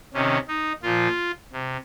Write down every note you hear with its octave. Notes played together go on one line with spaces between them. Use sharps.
C3 D#3 C#4
D#4
A#2 F3 F4
C3